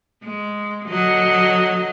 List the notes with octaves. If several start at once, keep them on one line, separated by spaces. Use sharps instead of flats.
G#3
D3 F#3 D#5